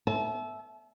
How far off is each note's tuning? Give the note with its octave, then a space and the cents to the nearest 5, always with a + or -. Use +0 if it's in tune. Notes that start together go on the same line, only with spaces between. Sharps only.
E5 +0 A5 -35